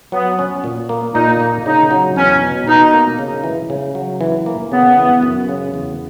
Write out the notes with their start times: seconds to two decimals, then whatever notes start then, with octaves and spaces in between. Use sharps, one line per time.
0.12 F#3 B3
0.39 C#4
0.64 A#2
0.89 A#3
1.14 A#2 D#4
1.40 A#3
1.66 C#3 D#4
1.91 F#3
2.16 E2 C#4
2.42 B2
2.67 B2 D#4
2.93 A#3
3.19 C#3
3.44 E3
3.70 C#3
3.95 F#3
4.21 E3
4.46 A#3
4.71 C#3 B3
4.97 E3
5.22 F#2
5.49 C#3
5.74 E2